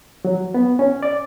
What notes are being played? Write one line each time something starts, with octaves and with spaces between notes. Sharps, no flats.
F#3
B3
C#4
D5